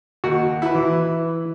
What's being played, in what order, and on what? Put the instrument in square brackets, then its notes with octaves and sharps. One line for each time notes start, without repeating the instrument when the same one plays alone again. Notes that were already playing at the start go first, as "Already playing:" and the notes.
[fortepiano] D#2 [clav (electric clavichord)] F#4
[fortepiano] E4 B4
[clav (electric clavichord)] E3